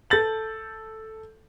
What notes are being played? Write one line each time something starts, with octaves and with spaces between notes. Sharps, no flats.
A4 G6 A6 F#7